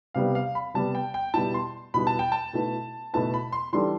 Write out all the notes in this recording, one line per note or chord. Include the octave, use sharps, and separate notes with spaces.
C3 G3 B3 F5
F5
B5
C3 G3 B3 A5
G5
G5
B2 G3 B3 E4 A5
C6
B2 G3 B3 E4 B5
A5
G5
A5
B2 A3 E4 B4
B2 A3 E4 B4 A5
B5
C6
E3 G3 D4 A4 C6